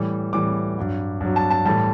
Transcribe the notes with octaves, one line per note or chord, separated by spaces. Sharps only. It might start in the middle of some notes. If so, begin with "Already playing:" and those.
Already playing: A2 E3 G3
A2 E3 G3 D6
G2 F#3
G2 F#3
A5
A5
A2 E3 G3 A5